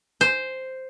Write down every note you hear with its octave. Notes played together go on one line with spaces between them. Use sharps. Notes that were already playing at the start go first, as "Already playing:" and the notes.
C5